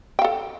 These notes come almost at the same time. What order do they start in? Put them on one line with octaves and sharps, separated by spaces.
G5 F5 A4